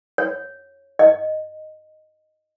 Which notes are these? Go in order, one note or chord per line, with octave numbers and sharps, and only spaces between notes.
C#5
D#5